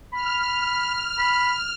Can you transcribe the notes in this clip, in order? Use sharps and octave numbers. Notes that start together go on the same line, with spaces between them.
B5 F6
B5